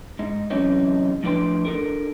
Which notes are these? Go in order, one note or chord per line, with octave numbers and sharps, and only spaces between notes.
G#2 D#4
F#2 C3 E3 C4 C#4 D#4
A2 F3 D4 B4 G5 C6
D4 D#4 A4 A#4